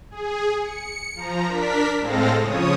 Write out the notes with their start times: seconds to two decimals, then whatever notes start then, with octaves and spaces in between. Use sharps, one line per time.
0.10 G#4
0.60 C#7
1.15 F3 A#5
1.47 D4 A#4 B6
1.99 A2 G#3 C4 A4 F5 A#6
2.41 C#3 F3 C#5 D#6